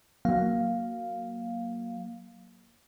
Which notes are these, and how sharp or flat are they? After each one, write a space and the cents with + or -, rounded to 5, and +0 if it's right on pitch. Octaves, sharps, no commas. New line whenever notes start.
F#3 +0 A#3 +0 F5 +0